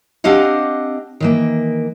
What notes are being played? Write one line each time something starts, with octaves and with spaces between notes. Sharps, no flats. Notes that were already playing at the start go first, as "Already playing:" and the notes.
C4 D4 G4 D#5 F5 F#5
D#3 E3 A#3